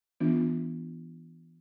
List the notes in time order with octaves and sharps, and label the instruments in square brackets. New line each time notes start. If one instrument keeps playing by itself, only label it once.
[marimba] E3 B3 D4 F4